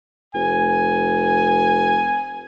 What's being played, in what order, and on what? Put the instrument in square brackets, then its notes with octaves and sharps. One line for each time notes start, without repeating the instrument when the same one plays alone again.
[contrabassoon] F1 [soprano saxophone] G#5